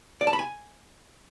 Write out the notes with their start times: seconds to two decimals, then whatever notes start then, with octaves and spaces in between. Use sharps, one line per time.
0.21 D5
0.27 A5
0.33 B5
0.39 G#5